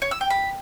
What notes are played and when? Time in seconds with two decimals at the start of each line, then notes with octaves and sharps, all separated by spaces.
0.02 C#5
0.11 E6
0.21 G5
0.30 B5